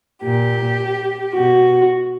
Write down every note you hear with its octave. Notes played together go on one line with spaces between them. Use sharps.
A#2 G4
B2 F#4